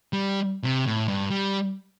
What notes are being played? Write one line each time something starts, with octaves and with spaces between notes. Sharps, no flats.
G3
C3
A2
G2
G3